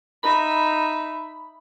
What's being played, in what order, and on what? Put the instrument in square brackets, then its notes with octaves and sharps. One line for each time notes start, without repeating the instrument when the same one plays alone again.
[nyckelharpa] D#4 E5 [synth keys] B5